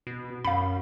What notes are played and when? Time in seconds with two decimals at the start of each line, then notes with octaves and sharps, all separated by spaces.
0.07 B2
0.45 F#2 F5 B5